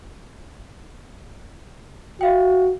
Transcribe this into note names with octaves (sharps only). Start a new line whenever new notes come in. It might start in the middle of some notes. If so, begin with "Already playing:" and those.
F#4 E5 F5 G5